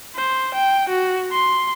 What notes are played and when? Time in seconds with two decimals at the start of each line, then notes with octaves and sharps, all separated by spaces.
0.15 C5
0.54 G5
0.89 F#4
1.32 C6